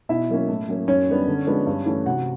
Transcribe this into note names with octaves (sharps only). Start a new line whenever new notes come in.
B2 E4 E5
F#3 A#3 C#4
A2
F#3 A#3 C#4
F#2 C#4 C#5
D#3 G3 B3 D4
D3
F3 G#3 B3 D4
G2
E3 A3 C#4
C3 F#4 F#5